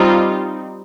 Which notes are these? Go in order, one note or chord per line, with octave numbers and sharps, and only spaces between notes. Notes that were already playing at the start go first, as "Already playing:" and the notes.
Already playing: G3 C4 D#4 F4